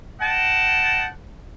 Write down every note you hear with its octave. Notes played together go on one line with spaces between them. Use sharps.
D#5 F#5 G5 A5